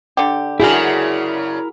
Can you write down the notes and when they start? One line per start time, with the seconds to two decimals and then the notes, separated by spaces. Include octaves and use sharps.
0.17 D3 G4
0.60 F#2 C#3 D4 E4 F#4 G#4 A#4